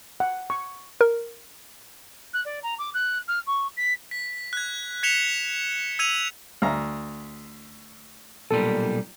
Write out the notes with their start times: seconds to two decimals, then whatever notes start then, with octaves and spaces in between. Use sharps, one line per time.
0.20 F#5
0.50 C#6
1.01 A#4
2.33 F#6
2.45 D5
2.63 A#5
2.78 D6
2.94 F#6
3.28 F6
3.46 C#6
3.77 B6
4.11 B6
4.53 F#6 G#6
5.03 G#6 B6 C#7 E7 F7 G7
5.99 E6 G#6 D#7 F7
6.62 D2 F5 A#5
8.51 B1 A#2 G3 A4